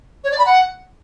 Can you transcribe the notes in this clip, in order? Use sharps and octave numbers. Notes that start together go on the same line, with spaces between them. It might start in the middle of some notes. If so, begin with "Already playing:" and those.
C#5
D5
B5
F#5